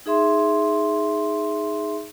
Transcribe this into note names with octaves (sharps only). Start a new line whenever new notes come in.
D#4 G#4 E5 C6